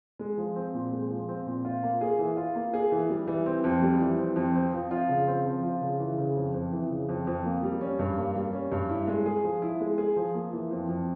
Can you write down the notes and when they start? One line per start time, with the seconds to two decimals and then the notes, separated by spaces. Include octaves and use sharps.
0.19 G#3
0.37 F3
0.56 C4
0.74 A#2
0.92 G#3
1.10 F3
1.28 C4
1.46 A#2
1.65 F4
1.83 A#3
2.01 G#4
2.19 E3
2.37 F4
2.55 A#3
2.73 G#4
2.92 E3
3.10 G3
3.27 E3
3.46 C4
3.64 F2
3.82 G3
4.00 E3
4.18 C4
4.36 F2
4.55 C4
4.73 F3
4.91 F4
5.09 C#3
5.27 C4
5.45 F3
5.63 F4
5.81 C#3
6.00 E3
6.18 C#3
6.36 F2
6.54 F2
6.72 E3
6.90 C#3
7.09 F2
7.27 F2
7.45 A#3
7.63 G3
7.81 C#4
7.99 G2
8.17 A#3
8.35 G3
8.53 C#4
8.72 G2
8.89 E4
9.07 G#3
9.26 G#4
9.44 F3
9.62 E4
9.80 G#3
9.98 G#4
10.16 F3
10.34 A#3
10.53 E3
10.71 F2
10.89 F2